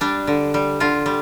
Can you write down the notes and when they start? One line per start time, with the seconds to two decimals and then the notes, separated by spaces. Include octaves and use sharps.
0.01 G3 D4
0.27 D3
0.54 G3
0.80 D3 F4
1.06 G3